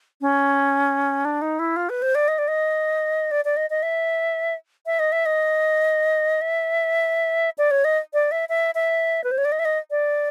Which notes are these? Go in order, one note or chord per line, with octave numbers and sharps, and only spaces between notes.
C#4
D4
D#4
E4
F4
B4
C5
D5
D#5
D5
D#5
D5
D5
D#5
D#5
E5
E5
D#5
E5
D#5
E5
D5
C#5
D#5
D5
E5
E5
E5
B4
C5
C#5
D5
D#5
E5
D#5
D5